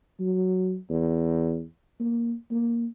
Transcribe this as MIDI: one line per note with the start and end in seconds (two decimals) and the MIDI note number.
0.20 0.77 54
0.89 1.63 40
2.00 2.33 58
2.51 2.86 58